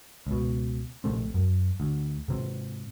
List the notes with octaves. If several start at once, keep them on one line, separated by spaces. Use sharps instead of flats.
C#2 B2
A#1 C3 A3 C4
F#2
D2
G#2 C3 C4